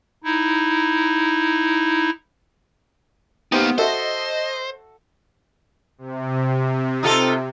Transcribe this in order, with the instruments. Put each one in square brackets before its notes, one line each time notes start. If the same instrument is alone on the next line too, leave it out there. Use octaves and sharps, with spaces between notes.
[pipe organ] D#4 E4
[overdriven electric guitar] A#3 D#4 [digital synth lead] B3 [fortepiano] G4 C5 G5
[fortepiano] F#4 A4 E5 [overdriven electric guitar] C5 [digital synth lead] D#5
[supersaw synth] C3
[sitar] D#4 F4 A4